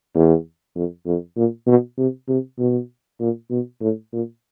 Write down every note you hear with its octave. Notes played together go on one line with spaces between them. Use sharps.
E2
F2
F2
A#2
B2
C3
C3
B2
A#2
B2
A2
A#2